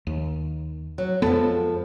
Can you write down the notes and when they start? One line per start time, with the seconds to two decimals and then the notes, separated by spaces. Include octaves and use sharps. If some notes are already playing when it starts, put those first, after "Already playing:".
0.07 D#2
0.98 F#3
1.22 F2 F3 G#3 B3 A4